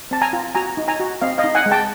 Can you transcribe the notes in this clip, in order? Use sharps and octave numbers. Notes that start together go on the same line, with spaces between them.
C4 A5
G#5 A#5
F4
F#4 G#5 A#5
D#4
G#5 A#5
F#4
C4 D#5 F5
D#5 F5
D#4
F#5 G#5
G#3
G5 A5